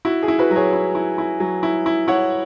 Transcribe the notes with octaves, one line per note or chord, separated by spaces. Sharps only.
E4 F#4
G#4
E4
F#4 B4
F#3
G#4 C#5
E4
E4
E4
F#3
E4
E4
E4 C#5 F#5